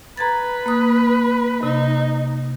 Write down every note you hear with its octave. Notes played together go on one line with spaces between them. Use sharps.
B4 A#5 G#6 A6
A#3 D#6 F#6
C3 D#4